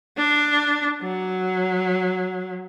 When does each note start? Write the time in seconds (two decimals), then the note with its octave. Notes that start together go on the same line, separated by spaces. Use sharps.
0.17 D4
1.03 F#3